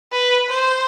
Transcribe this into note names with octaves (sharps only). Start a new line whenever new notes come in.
B4
C5